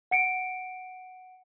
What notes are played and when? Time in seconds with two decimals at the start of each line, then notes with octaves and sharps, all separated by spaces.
0.11 F#5 C#7 D7